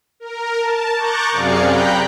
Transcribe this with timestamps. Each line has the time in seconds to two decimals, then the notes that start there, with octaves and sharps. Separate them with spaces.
0.20 A#4
0.59 A5
0.96 A#5 C#6 D6 F#6 G6 A6
1.31 F#2 C3 G#4 D5 F5 C#7
1.65 G5 A#5 B5 F#6 G6